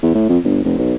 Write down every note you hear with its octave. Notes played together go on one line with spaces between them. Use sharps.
E2
A2
F2
G1
F1
B1